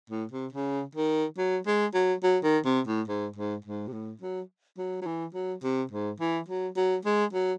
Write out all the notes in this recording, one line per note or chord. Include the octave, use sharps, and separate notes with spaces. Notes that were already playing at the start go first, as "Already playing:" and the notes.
A2
C3
C#3
D#3
F#3
G#3
F#3
F#3
D#3
C3
A2
G#2
G#2
G#2
C3
A2
F#3
F#3
F#3
E3
F#3
C3
G#2
E3
F#3
F#3
G#3
F#3